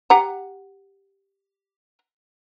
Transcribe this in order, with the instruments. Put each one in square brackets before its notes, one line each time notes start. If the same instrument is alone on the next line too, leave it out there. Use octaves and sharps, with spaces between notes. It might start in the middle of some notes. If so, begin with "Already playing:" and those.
[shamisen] G4 F#5 A#5